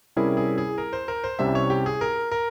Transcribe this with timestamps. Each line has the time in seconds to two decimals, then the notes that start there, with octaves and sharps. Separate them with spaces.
0.16 C3 G3 C#4 E4 G#4 A#4
0.37 G#4
0.58 G#4
0.78 A#4
0.93 C5
1.08 A#4
1.24 C5
1.39 C2 C3 G3 C#4 E4 E5
1.55 C#5
1.70 G4
1.86 G#4
2.01 A#4
2.31 A#4